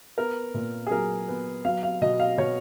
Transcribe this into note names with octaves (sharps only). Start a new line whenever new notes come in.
B3 A#4
A#2
G#4
F#3 A#4
B3
F#3 F5
F5
B2 D#5
F5
B2 C#5